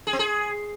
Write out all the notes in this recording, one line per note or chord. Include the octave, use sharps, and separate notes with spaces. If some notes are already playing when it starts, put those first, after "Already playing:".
G#4
C4
G#4